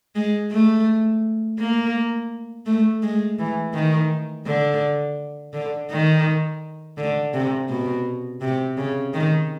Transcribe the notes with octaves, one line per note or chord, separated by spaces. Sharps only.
G#3
A3
A#3
A3
G#3
E3
D#3
D3
D3
D#3
D3
C3
B2
C3
C#3
D#3